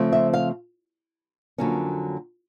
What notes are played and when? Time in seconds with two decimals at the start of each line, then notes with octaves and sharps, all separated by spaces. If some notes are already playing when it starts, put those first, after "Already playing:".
Already playing: C#3 F3 A3 C4
0.12 E5
0.33 F5
1.58 F2 D3 F#3 A#3 C#4